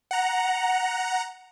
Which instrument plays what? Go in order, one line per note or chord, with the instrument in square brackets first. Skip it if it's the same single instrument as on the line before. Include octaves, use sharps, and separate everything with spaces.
[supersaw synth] F#5 A#5